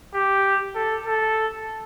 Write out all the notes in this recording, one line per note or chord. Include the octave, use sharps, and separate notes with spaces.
G4
A4
A4